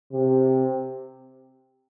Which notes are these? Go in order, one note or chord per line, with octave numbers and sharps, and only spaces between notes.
C3